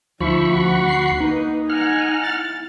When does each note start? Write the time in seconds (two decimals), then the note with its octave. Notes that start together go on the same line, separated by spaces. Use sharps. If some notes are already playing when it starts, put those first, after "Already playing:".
0.20 D2 F3 D#4 E5 B5 C#6
0.53 F#4 F#5
0.88 C7
1.20 A#3 D#4 B4
1.70 F#5 G#5 A#5 F6
2.23 E4 A6